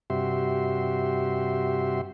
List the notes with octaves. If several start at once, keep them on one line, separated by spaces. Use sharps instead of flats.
G2 C3 F#4 G4 E5 C6